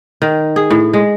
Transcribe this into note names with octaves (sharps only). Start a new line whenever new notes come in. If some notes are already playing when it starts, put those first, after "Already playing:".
D#3
G#4
A2
G#3